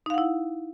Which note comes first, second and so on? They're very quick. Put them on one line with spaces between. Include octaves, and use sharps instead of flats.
D#4 F5 F#5 E4